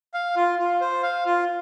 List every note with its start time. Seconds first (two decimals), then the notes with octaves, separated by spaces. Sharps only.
0.14 F5
0.36 F4
0.59 F4
0.81 C5
1.03 F5
1.26 F4